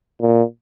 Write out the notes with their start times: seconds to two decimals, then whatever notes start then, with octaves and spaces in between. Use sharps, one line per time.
0.21 A#2